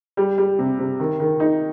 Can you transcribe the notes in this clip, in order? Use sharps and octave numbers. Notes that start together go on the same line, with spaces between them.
G3
G3
C3
C3
D#3
D#3
D#4